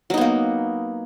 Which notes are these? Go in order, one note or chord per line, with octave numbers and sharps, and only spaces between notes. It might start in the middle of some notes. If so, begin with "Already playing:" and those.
F#3 A#3 B3 D#4